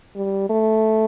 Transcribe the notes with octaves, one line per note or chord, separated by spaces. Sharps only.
G3
A3